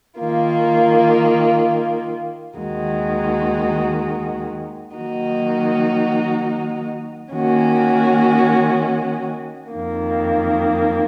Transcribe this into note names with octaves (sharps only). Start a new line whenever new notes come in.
D#3 A#3 F4
D#2 D#3 G#3 D#4 F#4
D#3 F#3 A#3 D#4 F#4
D#3 A#3 C#4 F#4
F2 D#3 A#3